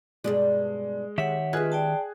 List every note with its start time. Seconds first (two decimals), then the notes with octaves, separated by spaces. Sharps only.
0.24 G2 B2 G#3 D5
1.18 D#3 G4 C#5 E5 F#5
1.53 G#3 C#4 F4 G#4 B4 D#5 F#6 G#6
1.72 D5 G5 A5